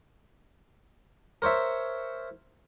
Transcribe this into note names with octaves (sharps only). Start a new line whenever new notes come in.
A#4 C5 C#5 E5